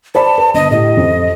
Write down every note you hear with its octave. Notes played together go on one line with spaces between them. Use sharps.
C5 D5 A5 B5
B4
G1 D#5
A2 G4 D#5
F2